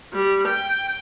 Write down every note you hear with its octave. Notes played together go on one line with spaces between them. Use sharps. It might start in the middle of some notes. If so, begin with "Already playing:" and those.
G3
G5